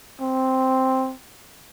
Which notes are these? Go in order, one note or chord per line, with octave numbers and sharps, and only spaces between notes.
C4